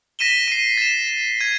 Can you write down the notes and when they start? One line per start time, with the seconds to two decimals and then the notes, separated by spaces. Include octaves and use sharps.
0.19 A#6 B6 D#7 E7 G7
0.48 C7 D#7
0.77 A6 E7
1.40 G#6 D#7